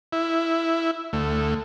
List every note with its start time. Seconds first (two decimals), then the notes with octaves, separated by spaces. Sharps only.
0.13 E4
1.13 D2 A3